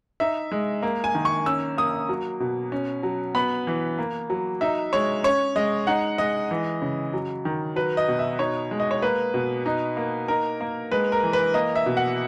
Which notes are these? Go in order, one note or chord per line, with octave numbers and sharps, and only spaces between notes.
D#4 E5
G#3
A#3
G#5
D#3
C#6
C#4 E6
A#3 D#6
F#3
B2
C#4
F#3
B3 B5
E3
A#3
F#3
D#4 E5
G#3 C#5
C#4 C#5
G#3 D#5
D#4 F#5
G#3 D#5
E3
C#3
F#3
D#3
F#3 B4
D#5
B2
E5
D#4 C#5
G#3
D#5
C#5
A#3 B4
B2
D#4
A#3
D#4 A#4
A#3
G#3 B4
A#4
E3
B4
A#3 D#5
E5
B2
F#5